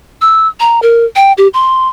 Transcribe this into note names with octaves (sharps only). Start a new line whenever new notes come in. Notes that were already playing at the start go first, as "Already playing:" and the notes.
E6
A#5
A#4
G5
G4
C6